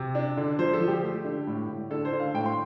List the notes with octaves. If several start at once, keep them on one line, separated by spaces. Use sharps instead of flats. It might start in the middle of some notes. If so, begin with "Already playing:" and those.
Already playing: C3
D4
D3
F3 C5
A4
F3
G4
A3
D3
A2
A2
D3 A4
C5
D3
F5
A2 G5
C6